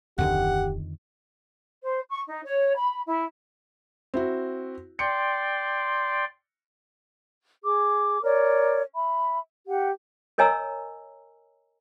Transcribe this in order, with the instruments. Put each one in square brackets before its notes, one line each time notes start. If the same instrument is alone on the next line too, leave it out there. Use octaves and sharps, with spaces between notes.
[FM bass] D1 [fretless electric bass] F2 D3 D#3 [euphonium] G4 [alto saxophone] F#5
[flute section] C5
C#6
D#4
C#5
B5
E4
[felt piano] C4 E4 F#4
[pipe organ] D5 G5 C6 [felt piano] C#7
[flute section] G#4 D6
A#4 C#5 D5
E5 B5
G4 F#5
[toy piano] A#4 C#5 D#5 G#5 A#5 E6